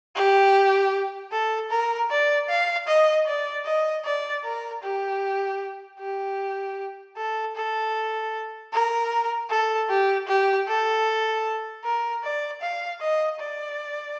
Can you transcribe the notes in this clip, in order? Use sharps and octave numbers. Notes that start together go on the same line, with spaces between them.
G4
A4
A#4
D5
F5
D#5
D5
D#5
D5
A#4
G4
G4
A4
A4
A#4
A4
G4
G4
A4
A#4
D5
F5
D#5
D5